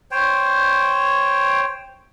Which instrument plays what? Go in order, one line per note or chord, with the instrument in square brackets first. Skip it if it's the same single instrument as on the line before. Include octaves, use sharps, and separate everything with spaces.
[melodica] C5 C#5 G5